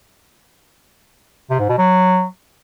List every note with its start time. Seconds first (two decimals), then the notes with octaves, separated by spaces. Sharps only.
1.50 C3
1.59 G#2
1.69 B2
1.78 F#3